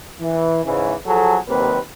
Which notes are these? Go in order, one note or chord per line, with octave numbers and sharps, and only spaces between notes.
E3
G#2 C#3 E3
F3 F#3 G#4 A4
D#2 C3 F#3 A#3 C4 B4